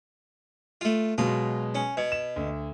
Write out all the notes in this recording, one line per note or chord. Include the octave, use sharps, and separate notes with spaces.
A3 F4
B2 F#3 G#3 F4
C#4
B2 G#6
E7
D2